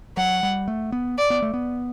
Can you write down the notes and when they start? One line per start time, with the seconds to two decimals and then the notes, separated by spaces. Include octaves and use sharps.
0.17 F#3 F#5
0.43 G3
0.68 A3
0.92 B3
1.18 D5
1.30 B3
1.42 A3
1.54 B3